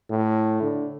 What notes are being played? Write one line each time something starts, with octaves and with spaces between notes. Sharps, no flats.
A2
D3